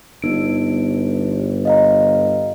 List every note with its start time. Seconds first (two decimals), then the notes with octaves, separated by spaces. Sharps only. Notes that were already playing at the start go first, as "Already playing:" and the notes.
0.22 G1 B3 D#4 D7
1.65 D#5 F5 A#5